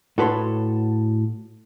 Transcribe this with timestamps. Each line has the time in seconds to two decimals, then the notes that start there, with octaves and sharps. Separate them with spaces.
0.18 A2 F#4 A4 B4 C#5 C6